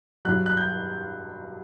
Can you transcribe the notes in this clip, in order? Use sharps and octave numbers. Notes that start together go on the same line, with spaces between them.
G2 F#3 F#6
F#6
G6